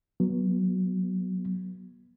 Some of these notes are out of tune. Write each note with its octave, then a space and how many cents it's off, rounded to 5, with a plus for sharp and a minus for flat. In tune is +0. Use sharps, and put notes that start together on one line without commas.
F#3 +0 B3 -30